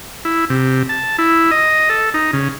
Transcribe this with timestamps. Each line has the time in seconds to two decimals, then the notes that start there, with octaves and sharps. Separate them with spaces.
0.25 E4
0.50 C3
0.89 A5
1.19 E4
1.51 D#5
1.90 A4
2.14 D#4
2.33 C#3